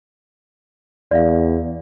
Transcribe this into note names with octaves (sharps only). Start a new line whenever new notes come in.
E2 D5 E5 F5